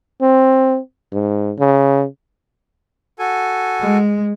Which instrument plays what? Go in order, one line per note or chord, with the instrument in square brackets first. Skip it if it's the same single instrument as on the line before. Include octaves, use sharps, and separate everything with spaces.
[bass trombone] C4
G#2
C#3
[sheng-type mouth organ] F#4 A4 G#5
[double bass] G#3